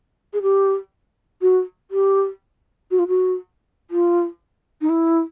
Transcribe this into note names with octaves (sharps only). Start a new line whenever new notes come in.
G#4
G4
F#4
G4
F#4
F4
F#4
F4
D#4
E4